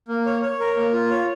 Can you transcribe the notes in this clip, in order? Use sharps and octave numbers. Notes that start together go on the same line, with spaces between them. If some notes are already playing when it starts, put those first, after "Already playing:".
A#3
C#5
C#5
A#4
A#3
F4
C#5